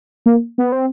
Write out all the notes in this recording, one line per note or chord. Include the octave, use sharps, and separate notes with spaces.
A#3
B3
C4